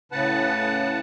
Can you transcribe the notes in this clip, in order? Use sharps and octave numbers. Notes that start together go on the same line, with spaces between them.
A2 C#3 B4 F#5 A5